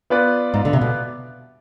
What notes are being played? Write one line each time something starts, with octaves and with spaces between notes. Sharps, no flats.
B3 F4 B4 D5
G#2
D3
C3
B2